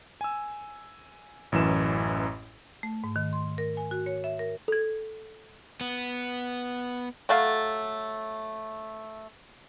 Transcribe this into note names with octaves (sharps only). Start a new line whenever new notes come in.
G#5 E6
A1 F#2 E3 E7
A3
G#2
D#3
C6
A#4
G#5
F#4
C#5
E5
A#4
A4 G#6
B3
F#3 A3 F5